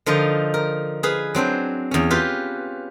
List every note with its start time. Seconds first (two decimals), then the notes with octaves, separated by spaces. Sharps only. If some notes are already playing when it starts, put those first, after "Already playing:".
0.06 D3 F3 D#4 F4 A#4
0.54 A#4
1.03 G#4 B4 F5
1.35 F#3 C4 D4 C5
1.91 E2 C#4
2.10 F4 G4 B4